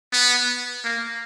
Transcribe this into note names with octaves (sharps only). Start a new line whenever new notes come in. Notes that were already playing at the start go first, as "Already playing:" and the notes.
B3
A#3